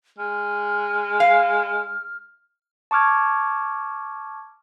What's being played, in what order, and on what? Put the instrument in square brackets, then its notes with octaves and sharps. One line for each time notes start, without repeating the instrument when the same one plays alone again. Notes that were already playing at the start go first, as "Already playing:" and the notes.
[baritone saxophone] G#3 [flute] F6
[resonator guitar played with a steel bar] F5
[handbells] A5 C#6 D6 F6 G#6